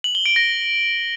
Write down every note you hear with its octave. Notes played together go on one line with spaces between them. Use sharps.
F#7
G7
D7
A#6